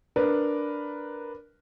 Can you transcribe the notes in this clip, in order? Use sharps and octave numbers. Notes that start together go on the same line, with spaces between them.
D4 A#4 B4